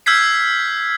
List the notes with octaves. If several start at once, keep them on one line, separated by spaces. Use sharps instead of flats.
E6 F6 G6 G#6 B6 C7